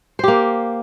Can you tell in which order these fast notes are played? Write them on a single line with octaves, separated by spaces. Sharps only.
C5 G4 A#3